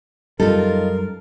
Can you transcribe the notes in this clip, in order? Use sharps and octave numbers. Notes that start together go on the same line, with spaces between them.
F#2 G3 D#4 F4 A4 A#4